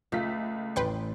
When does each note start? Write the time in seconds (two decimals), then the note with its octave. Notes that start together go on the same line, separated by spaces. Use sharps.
0.12 C#2 A3 F4 B6
0.76 A1 B4 G5 C6